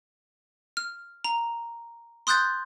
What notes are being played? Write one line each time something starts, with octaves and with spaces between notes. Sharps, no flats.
F6
A#5
C6 D#6 F#6 G6 A6